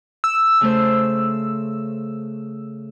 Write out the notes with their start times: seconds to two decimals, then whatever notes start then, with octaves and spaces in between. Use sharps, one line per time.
0.24 E6
0.61 C#3 A3 C5